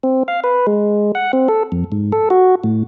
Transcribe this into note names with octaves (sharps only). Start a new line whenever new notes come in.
C4
F5
B4
G#3
F#5
C4
A4
F2
G#2
A4
F#4
A2